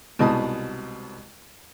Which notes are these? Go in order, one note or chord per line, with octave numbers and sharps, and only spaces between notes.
C2 G#2 B2 D#5 A5 D#6